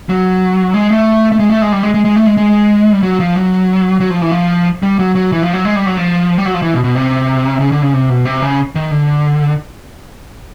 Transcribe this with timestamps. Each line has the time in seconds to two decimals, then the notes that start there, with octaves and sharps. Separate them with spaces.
0.09 F#3
0.74 G#3
0.91 A3
1.32 A3
1.39 G#3
1.50 A3
1.62 G#3
1.72 G3
1.83 G#3
1.94 G#3
2.05 G#3
2.16 A3
2.26 G#3
2.37 G#3
2.93 G3
3.03 F#3
3.20 F3
3.36 F#3
4.00 F#3
4.10 F3
4.22 E3
4.32 F3
4.83 G3
4.99 F#3
5.15 F#3
5.32 E3
5.43 F3
5.53 F#3
5.65 G#3
5.76 G3
5.86 F#3
5.97 F3
6.38 G3
6.45 F#3
6.54 F3
6.62 E3
6.74 B2
6.84 B2
6.95 C3
7.60 C#3
7.72 D3
7.82 C#3
7.93 C3
8.10 B2
8.25 C3
8.42 C#3
8.75 D#3
8.91 D3